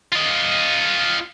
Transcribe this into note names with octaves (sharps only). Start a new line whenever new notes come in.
F4 D#5